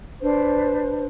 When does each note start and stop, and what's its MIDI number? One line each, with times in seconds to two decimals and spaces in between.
0.21 1.04 62
0.21 1.04 71
0.21 1.04 72